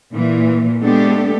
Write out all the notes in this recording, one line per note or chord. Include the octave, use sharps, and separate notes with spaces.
A#2 E3
G#3 A3 B3 D4 G4 A4